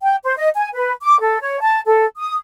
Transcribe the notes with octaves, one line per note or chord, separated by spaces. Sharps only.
G5
C5
D#5
G#5
B4
D6
A4
C#5
A5
A4
D#6